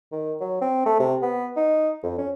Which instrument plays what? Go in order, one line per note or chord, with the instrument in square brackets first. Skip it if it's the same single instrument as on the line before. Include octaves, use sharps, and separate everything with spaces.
[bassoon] D#3
F#3
C4
A3
C3
B3
D#4
F2
C#4